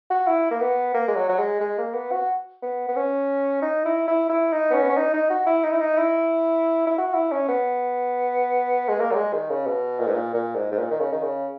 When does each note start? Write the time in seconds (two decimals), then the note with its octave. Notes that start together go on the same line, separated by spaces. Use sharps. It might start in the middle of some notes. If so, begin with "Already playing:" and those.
0.11 F#4
0.27 E4
0.51 A#3
0.61 B3
0.94 A#3
1.08 G#3
1.16 F#3
1.29 F#3
1.39 G#3
1.61 G#3
1.78 A#3
1.94 B3
2.12 F#4
2.62 B3
2.88 B3
2.96 C#4
3.62 D#4
3.85 E4
4.08 E4
4.29 E4
4.52 D#4
4.70 B3
4.74 C#4
4.82 B3
4.89 C#4
4.97 D#4
5.14 D#4
5.30 F#4
5.46 E4
5.64 D#4
5.72 E4
5.81 D#4
5.98 E4
6.87 E4
6.98 F#4
7.14 E4
7.32 C#4
7.49 B3
8.89 G#3
9.00 A#3
9.11 F#3
9.15 G#3
9.33 D#3
9.50 C#3
9.67 B2
9.99 A#2
10.08 G#2
10.14 A#2
10.34 A#2
10.56 G#2
10.72 G#2
10.79 A#2
10.91 D#3
11.00 C#3
11.12 D#3
11.23 C#3